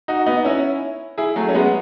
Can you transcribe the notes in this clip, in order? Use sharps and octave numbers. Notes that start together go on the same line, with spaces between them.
D#4 F#4
B3 D#4
C#4 E4
E4 G#4
F#3 A3
C#4
G#3 B3